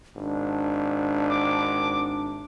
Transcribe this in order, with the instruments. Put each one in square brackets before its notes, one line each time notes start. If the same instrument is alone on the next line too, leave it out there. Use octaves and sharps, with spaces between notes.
[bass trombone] G#1 [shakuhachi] D4
[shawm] D6